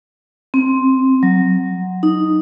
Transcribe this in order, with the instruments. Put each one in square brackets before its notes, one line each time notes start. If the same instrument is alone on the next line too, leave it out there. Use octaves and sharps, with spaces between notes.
[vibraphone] C4
F#3
D#4